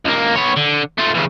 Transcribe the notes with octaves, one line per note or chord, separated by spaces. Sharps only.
C#2 A#3
B3 C#5
D3
A3 F4
E2 C#3